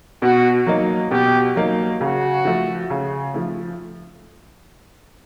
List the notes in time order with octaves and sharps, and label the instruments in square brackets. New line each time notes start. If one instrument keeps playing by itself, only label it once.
[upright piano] B2 [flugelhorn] F#4
[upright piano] F#3 A#3 D#4
[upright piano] B2 [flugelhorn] G4
[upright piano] F#3 A#3 D#4
[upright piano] C#3 [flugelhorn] F#4
[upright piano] F3 A3
C#3
F3 A3